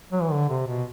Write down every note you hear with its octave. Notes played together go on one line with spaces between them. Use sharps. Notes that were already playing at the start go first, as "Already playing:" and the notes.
F#3
E3
D3
C3
B2